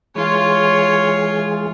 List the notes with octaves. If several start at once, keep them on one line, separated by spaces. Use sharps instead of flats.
E3 G#3 F4 G#4 C#5